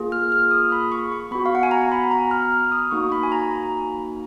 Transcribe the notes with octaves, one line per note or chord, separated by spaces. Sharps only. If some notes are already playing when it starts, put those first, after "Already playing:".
Already playing: A#3 F4 G#4
F6
F6
D#6
B5
C#6
C#6
B3 F#4 B5
F5
F#5
G#5
A#5
B5
A#5
F6
F6
D#6
A#3 D#4 F#4 C#6
B5
G#5
A#5